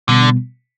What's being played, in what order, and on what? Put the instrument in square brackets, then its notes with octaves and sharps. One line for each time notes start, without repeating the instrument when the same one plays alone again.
[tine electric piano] B2 G3 B3 [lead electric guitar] D3